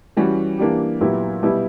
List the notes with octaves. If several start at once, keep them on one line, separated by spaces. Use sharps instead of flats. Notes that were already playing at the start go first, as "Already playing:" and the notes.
E3 G3 C#4 F#4
E3 A#3 D4 G4
A#2 F#3 B3 E4 G4
B2 G3 B3 E4 G4